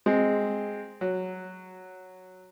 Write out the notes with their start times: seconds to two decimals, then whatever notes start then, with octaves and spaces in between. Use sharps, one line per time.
0.06 G#3 C4
1.01 F#3